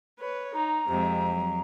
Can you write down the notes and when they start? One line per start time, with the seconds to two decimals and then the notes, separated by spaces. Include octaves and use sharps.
0.19 B4 C#5
0.54 D#4 A#5
0.89 F2 C3 G#3
1.29 F#3